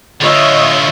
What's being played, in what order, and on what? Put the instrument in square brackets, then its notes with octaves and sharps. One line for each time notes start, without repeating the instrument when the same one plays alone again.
[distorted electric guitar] D3 F4 [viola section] C#5 D#5 E5